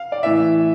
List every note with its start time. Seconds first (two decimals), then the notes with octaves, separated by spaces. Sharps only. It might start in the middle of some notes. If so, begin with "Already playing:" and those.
Already playing: F5
0.12 D5
0.23 A2 E3 E5